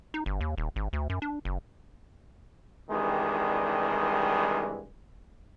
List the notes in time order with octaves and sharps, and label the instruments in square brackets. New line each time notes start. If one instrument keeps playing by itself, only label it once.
[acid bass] D#4
G1
D#2
D#1
G#1
D2
F#2
D4
F#1
[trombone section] C2 G2 D#3 E3 G#3